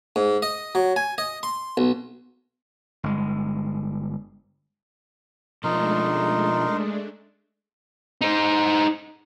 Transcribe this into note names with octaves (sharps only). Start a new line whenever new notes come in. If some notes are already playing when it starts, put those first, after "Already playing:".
G#2
D#5
F#3
G#5
D#5
C6
B1
G1 G#3
B2 F3 G#3 A3 D4 D#4 A#4 C6
D#4 C5